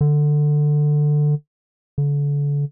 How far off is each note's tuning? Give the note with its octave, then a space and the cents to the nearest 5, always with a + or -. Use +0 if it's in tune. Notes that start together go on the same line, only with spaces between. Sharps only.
D3 +15
D3 -35